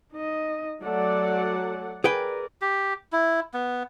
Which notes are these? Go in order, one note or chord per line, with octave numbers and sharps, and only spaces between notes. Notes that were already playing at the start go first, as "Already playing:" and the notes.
D#4 D#5
F#3 A3 D5 F#5
G#4 A#4 B4 D5 G5
G4
E4
B3